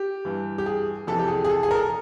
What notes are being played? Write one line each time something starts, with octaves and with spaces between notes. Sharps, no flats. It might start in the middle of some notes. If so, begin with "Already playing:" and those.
Already playing: G4
G2 E3
G4
G#4
F2 C3 E3 A4
G4
G#4
G#4
A4
G#4
A#4
A4